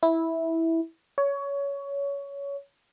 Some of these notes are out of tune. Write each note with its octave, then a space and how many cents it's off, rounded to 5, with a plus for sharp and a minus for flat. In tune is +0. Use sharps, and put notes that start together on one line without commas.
E4 -10
C#5 +20